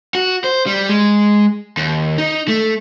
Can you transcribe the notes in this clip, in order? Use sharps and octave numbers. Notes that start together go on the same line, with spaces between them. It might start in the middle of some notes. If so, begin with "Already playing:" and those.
F#4
C5
G3
G#3
D#2
D#4
A3